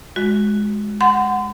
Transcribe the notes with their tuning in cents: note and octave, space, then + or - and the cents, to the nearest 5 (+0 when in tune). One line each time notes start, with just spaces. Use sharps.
G#3 +5 F#4 +0
F#5 +5 C6 -40